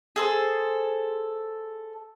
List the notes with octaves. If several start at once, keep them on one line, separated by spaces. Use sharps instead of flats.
G#4 A4 C5